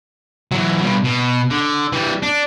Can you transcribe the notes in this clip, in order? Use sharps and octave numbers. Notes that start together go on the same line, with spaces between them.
E3 F#3
G2 B2
B2
D3
E3 G3
D4